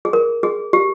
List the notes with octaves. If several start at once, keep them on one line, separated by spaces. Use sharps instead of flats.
G#4
A#4
G#4
G4